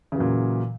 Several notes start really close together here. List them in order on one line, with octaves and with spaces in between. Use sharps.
C#3 E3 F#3 A#2